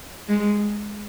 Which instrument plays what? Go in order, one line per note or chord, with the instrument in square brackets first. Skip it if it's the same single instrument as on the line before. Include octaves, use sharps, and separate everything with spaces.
[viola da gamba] G#3